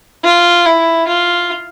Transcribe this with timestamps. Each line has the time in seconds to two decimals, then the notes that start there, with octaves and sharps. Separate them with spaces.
0.24 F4
0.65 E4
1.07 F4